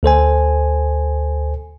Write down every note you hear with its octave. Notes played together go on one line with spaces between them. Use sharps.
D2 A4 C5 G#5